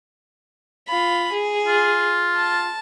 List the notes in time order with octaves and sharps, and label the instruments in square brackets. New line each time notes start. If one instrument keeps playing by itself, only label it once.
[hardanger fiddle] F4 B5
G#4
[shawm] F4
[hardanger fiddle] A5